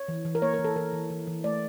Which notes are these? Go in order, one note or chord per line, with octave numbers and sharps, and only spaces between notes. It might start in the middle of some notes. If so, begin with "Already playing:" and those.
Already playing: C#5
E3
E3
A#4
A#3 C#5
A#4
E3
A4
E3 A#4
E3
E3
E3
A3 D5